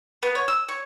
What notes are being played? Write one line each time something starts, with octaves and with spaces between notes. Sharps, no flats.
B3
C#5
E6
C#5